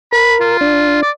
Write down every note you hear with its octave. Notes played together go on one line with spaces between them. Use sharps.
A#4 B5
F4
D4
D5